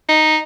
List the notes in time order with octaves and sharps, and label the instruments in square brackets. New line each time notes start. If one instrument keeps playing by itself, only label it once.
[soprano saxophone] D#4